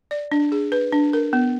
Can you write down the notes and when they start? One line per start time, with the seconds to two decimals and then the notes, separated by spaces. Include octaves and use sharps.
0.11 D5
0.32 D4
0.52 G#4
0.72 B4
0.92 D4
1.13 A#4
1.33 B3